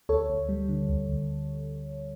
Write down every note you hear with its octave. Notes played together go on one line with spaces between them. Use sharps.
D2 A4 C#5
D2
G3
D3
D2
D2